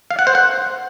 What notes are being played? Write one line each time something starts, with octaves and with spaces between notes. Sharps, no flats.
F5
F#5
C5
F#5